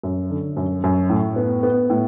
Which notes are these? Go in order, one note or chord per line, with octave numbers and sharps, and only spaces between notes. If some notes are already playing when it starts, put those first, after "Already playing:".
F#2
D3
F#2
F#2
A2
B3
B3
A2